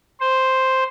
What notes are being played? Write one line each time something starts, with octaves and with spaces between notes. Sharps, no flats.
C5